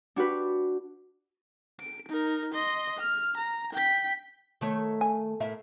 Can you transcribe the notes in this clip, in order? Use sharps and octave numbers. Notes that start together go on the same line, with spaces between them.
D4 F#4 G4 B4
D7
D#4 A#4
D#5 C6
F6
A#5
G5 B6
D#3 A3 C#5
G#5
A2 A#4 E5